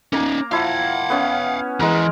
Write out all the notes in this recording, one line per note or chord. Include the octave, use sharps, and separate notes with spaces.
A#3 C#4 D#4 A#5
F3 E4 F5 F#5
B3 C#4
E2 E3 G#3 A#4